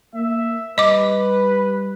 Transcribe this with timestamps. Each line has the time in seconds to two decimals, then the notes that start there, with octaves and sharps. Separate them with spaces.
0.14 A#3 E5
0.78 G3 B4 D#5 D6